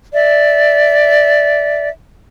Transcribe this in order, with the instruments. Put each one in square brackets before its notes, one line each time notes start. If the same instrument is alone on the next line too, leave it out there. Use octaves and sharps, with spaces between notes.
[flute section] D5 E5